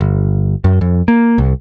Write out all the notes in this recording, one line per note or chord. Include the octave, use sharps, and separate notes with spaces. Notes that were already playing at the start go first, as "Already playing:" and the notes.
G1
F#2
F2
A#3
C2